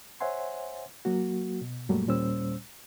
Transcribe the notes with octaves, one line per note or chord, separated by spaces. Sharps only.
C5 C#5 E5 F#5 G#5 C6
F#3 A#3 F#4
B2
F#2 A#2 F#3 G3 A3 A#3
D#2 A#2 G3 C#4 C5 E6